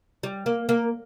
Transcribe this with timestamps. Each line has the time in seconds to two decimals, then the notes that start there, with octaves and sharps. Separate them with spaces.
0.23 G3
0.46 A#3
0.69 A#3